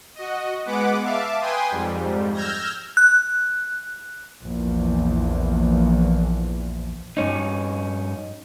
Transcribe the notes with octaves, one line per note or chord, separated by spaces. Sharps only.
F#4 D#5
G#3 B3 B4 F#5 D6
E5 F5 A5 D6
B4 G5 G#5 C6 D#6
F2 G#2 G3
E6 F6 G6 G#6 A#6
F#6
A#1 E2
G2 C#4 D#4